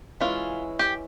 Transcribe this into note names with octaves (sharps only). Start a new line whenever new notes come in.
E3 G#3 C#4 E4 F4
G4